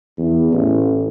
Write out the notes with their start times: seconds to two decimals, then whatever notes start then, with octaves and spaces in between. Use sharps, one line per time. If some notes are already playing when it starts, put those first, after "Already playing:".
0.18 E2
0.52 A1